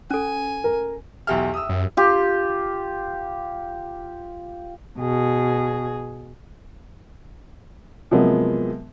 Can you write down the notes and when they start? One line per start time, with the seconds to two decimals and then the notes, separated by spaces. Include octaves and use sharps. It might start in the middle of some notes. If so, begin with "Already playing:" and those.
0.11 C#4 A4 G#5
0.64 A#4
1.27 B1 E2 G4 E5 F6
1.54 D#6 E6
1.69 F#2
1.97 F4 G4
4.99 B2 G#4
8.11 C3 F3 F#3 G#3 A#3 B3